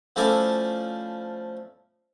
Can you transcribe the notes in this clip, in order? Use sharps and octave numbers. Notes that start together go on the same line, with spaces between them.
F3 A3 C#4 E4 A4 D5